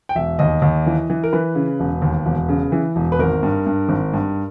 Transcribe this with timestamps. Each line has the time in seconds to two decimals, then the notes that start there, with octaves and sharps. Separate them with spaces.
0.09 G5
0.15 E1 E5
0.39 D#2 D#5
0.62 D#2
0.86 E3
1.10 E3
1.24 A#4
1.33 E3 B4
1.55 C#3
1.80 E1
2.02 D#2
2.26 E1
2.49 C#3
2.72 E3
2.96 E1
3.12 B4
3.19 G#1 A#4
3.43 G2
3.66 G2
3.89 G#1
4.13 G2